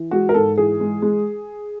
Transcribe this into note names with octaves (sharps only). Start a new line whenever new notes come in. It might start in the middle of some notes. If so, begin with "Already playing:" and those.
Already playing: E3
G#3 F#4
A#4
G#2 A4
E3 G#4
G#3
G#3